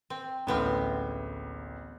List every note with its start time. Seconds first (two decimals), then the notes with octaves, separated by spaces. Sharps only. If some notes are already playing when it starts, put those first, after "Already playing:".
0.10 C4
0.47 A1 D2 G#3 B3 C4 F6